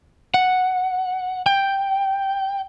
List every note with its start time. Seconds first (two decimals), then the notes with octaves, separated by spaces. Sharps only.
0.34 F#5
1.46 G5